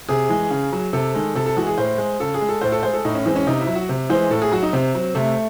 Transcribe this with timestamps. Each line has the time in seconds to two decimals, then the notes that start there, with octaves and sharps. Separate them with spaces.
0.09 C3 G#4
0.29 E3 G#3
0.50 C#3
0.72 F#3
0.93 C3 A4
1.15 D#3 G#3
1.35 C3 A4
1.46 A4
1.56 E3 G#3 F#4
1.67 G#4
1.78 A2 C5
1.98 G#3
2.20 C#3 A4
2.34 G#4
2.41 G#3
2.49 A4
2.61 A2 C5
2.72 A4
2.83 G#3 C5
2.94 A4
3.05 A2 D#4
3.15 C#4
3.26 E3 G#3 C4
3.36 C#4
3.47 C3 D#4
3.61 E4
3.67 F#3
3.75 F#4
3.89 C3
4.10 E3 G#3 C5
4.31 A2 A4
4.42 G#4
4.51 F#3 F#4
4.63 D#4
4.73 C3 C4
4.95 F#3
5.15 C3 A3